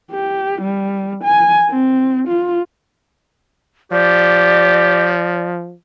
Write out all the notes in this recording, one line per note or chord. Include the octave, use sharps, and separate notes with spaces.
G4
G3
G#5
C4
F4
F3 G4 D5